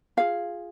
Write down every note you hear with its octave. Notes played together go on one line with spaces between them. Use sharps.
F4 G#4 F5